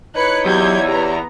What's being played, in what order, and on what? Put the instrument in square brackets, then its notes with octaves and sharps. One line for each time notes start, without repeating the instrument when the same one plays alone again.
[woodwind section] D#4 E4 C#5 [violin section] B4 F#6 C#7
[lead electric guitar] E2 [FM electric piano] F#3 G4 [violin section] G6 G#6
[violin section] B3 A#5 [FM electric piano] G4